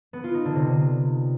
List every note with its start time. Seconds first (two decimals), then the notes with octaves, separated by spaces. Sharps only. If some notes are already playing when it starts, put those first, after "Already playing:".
0.13 B3
0.24 F4
0.35 D#4
0.45 D3
0.56 C3